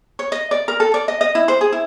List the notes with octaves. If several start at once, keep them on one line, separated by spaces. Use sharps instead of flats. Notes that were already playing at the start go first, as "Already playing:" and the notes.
C#5
D#5
D5
A#4
A4
D5
D#5
D#5
E4
C5
G#4
E4